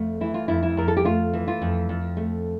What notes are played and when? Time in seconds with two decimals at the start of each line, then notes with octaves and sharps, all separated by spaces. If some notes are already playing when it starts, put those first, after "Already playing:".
Already playing: F2 A3
0.21 E3 E4
0.34 F4
0.48 F2 E4
0.63 E4
0.77 F2 A#4
0.88 A4
0.97 G4
1.05 A3 F4
1.34 E3
1.48 F4
1.62 F2
1.89 F2
2.17 A3